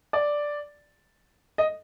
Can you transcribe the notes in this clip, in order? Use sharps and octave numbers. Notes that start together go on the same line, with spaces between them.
D5
D#5